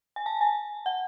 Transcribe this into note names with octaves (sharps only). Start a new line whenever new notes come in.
G#5
A5
G#5
F#5